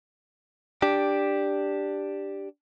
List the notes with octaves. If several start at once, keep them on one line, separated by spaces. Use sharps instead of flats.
D4 G4